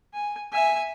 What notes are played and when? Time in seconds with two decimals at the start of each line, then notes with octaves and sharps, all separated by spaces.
0.14 G#5
0.53 E5 G#5